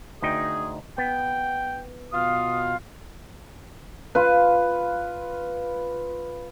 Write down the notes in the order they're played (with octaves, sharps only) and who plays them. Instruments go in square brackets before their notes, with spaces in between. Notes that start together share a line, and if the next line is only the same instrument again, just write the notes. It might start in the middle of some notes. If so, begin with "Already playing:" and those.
[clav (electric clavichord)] D2 D#4 G5 [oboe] G#4
[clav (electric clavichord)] B3 [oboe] G5
[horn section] B2 F4 F5 [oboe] D#6
[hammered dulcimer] F4 B4